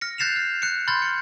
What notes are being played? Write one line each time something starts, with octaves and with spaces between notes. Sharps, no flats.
F6 A#6 C#7
F#6 G6 A6 C7 E7 F7
F6
F#6 C#7
B5 C6 F6 G6 A6
C#7